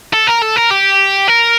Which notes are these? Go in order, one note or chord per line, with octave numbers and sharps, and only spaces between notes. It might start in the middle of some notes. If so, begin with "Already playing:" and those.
A4
A#4
A4
A#4
G4
A#4